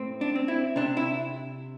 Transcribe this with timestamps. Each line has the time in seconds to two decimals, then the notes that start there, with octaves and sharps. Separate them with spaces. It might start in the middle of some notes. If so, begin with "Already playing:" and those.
Already playing: A2 C4
0.21 D4
0.36 C4
0.48 E4
0.76 C3 D4
0.97 E4